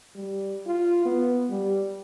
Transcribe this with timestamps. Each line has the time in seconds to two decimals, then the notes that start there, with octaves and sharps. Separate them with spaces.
0.15 G3
0.66 F4
1.06 B3
1.50 G3